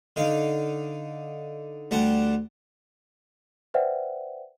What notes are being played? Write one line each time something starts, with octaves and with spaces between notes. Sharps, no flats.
D3 D#4 F5
D2 G3 F#5 A5
B4 C5 D5 E5 F#5 G5